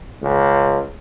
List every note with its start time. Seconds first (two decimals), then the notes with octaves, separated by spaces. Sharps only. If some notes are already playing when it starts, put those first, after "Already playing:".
0.22 C#2